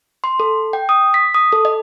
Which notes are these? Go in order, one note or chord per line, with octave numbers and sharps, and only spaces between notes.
C6
A4
G5
D#6
B6
D#6
A4
D#5